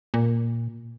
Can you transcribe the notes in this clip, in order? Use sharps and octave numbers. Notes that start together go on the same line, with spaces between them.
A#2